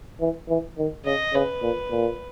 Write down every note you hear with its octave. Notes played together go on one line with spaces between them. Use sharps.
E3
E3
D#3
C#3 D#5
C#3 B4
A#2
A#2